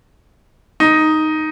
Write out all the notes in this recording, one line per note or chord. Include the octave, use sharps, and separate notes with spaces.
D#4